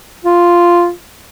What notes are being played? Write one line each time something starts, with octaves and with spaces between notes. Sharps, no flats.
F4